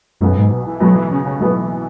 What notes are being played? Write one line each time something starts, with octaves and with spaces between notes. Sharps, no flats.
B1 F#2 B2 B3
G#2
B2
E3
B1 B2 F#3 B3
E3
C#3
C#3
B1 B2 E3 B3